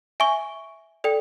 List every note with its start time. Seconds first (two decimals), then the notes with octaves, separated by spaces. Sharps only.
0.20 E5 G#5 C#6
1.04 A4 D5 G5